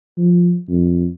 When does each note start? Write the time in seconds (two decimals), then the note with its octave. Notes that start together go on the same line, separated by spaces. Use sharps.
0.18 F3
0.69 F2